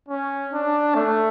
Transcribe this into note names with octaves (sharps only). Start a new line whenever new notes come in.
C#4
D4
A3